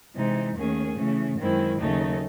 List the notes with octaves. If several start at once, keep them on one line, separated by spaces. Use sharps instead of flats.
C3 E3 G#3 D#4
D#2 D#3 A3 C#4 G#4
C#3 E3 A3 C#4
F#2 D#3 G#3 C4 E4
D#2 C#3 F#3 A3 D#4